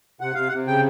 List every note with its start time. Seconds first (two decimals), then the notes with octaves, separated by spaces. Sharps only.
0.21 C3 F#5
0.35 C3 F5
0.48 F#5
0.52 C3
0.67 C#3 G5